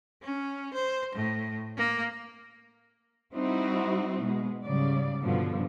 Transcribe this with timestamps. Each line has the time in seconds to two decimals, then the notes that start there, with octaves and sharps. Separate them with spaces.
0.22 C#4
0.74 C5
1.15 A2
1.77 A#3
3.34 G3 C4 D#4 E4 F#4
4.22 B2 G#3
4.64 G#2 C#3 F#3 G3 D5
5.22 G2 B2 D3 F3